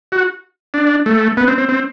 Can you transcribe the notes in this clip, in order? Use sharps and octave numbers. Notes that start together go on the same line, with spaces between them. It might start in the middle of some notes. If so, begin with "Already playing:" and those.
F#4
D4
A3
B3
C4
C4
C4